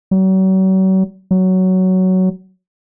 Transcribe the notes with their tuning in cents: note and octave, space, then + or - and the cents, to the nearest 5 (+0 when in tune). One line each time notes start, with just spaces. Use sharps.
F#3 +40
F#3 +10